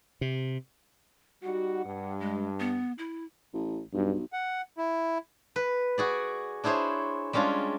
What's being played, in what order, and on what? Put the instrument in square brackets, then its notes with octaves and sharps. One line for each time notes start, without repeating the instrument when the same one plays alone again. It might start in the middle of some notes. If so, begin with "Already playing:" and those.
[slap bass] C3
[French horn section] G3 D#4 F#4 [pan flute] F#5
[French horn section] G2
[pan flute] G#3
B3
E4
[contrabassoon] A1
[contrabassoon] B1 [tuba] G2
[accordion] F#5
E4
[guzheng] B4
F#4 G#4 D5
D4 E4 G#4 C5 C#5
G3 G#3 C#4 D4 F4